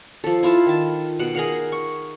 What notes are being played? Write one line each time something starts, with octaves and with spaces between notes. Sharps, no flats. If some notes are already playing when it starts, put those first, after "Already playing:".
F3 A4
E4 F4 A4 A5
D#3 A5
B2 F#5
G#4 A#4 F5 F#5
C#6